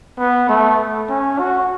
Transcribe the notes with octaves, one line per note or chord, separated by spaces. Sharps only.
B3
A3
C#4
F#4